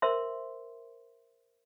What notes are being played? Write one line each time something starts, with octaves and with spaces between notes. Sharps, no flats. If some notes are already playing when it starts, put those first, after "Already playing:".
A#4 C5 E5 C6